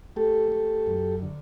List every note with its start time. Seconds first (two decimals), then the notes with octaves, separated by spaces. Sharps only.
0.16 A3 G4 A4
0.52 A3
0.87 F#2
1.22 D3